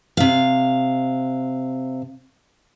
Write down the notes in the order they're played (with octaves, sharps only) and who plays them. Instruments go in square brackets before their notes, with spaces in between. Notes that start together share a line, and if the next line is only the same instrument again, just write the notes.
[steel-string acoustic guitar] C3 F5